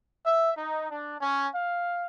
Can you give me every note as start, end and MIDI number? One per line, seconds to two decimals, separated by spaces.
0.24 0.50 76
0.56 0.88 63
0.90 1.16 62
1.21 1.48 61
1.53 2.05 77